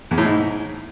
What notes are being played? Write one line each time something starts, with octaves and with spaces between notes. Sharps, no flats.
E2
A2
G#2